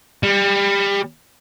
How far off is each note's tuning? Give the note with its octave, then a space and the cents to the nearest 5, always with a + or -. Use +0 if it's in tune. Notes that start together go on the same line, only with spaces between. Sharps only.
G3 +25